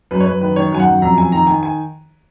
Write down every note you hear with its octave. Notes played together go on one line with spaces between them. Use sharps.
F#2 B4
C#5
F#2 B4
D#3 B4
D#3 C#5
F#2 G#5
F#5
F#2
F2 A#5
F2 G#5
D#3 A#5
D#3 G#5
G#5